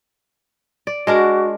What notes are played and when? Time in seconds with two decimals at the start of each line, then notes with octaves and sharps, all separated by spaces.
0.87 D5
1.07 G#3 D4 F#4 A#4